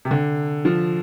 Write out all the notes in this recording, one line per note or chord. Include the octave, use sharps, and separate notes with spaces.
C3
D3
F3